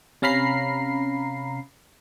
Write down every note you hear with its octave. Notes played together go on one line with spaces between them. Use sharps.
C3 C#4 F5 A#5 B5 C7